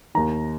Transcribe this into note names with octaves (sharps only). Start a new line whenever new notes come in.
D#2 D#3 A#5